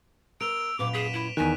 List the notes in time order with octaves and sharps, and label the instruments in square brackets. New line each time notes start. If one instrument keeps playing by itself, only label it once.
[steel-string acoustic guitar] A#4 [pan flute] E6 [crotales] D7 F7 G7
[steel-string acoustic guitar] F#2 A#2 B4 [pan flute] D6
[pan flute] G#4 [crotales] B6 D#7 E7
[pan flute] E4 [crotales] E7
[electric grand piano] E2 D#3 [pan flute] G#5 [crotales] F#6 B6